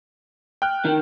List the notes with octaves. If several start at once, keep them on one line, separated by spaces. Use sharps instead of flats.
G5 F6 F#6
D#3